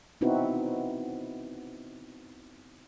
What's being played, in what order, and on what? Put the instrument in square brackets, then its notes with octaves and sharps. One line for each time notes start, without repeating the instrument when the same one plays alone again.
[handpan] B3 C4 D#4 E4 F#4 B4